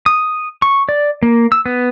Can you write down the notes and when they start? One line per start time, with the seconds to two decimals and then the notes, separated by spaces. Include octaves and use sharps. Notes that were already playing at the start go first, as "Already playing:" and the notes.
0.06 D#6
0.62 C#6
0.89 D5
1.23 A#3
1.52 E6
1.66 B3